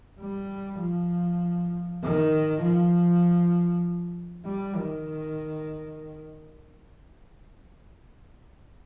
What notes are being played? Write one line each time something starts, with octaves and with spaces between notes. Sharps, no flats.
G3
F3
D#3
F3
G3
D#3